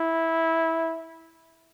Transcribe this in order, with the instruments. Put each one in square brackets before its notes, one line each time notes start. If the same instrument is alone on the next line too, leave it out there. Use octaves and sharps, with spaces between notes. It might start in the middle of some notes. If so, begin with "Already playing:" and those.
Already playing: [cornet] E4